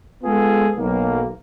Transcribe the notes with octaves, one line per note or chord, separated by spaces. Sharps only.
G#3 B3 F4 G#4 A4
B1 A#3